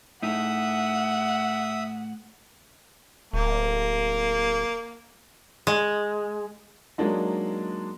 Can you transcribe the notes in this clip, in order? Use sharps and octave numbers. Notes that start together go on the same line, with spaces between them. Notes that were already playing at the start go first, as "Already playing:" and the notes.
A2 D#4 E5 F#5 D#6
D1 A#3
G#3
F#3 G#3 A#3 D4 D#4